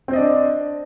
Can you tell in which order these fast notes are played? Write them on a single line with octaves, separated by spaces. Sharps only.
C4 C5 D#5 D5 D4